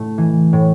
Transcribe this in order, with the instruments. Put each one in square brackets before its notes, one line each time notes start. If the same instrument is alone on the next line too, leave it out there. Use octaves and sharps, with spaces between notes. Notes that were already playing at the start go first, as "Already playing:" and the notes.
Already playing: [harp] A2 A3 E4
E3
A2